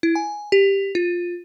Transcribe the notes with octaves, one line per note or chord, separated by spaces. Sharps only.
E4
G#5
G4
F4